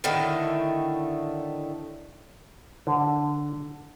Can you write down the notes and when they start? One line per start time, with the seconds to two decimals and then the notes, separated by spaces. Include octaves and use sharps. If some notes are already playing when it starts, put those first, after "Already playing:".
0.04 A2 D3 D#3 A3
2.87 D3